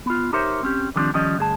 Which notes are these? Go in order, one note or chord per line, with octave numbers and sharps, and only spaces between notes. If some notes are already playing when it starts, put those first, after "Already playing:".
B3 F4
D#4 G4 A#4 C5 C#5 E5
C4 C#4 G4
D3 D#3 F3 G3 C4 D4
D#3 F3 G3 C#4 D#5
D2 G2 G#4 A5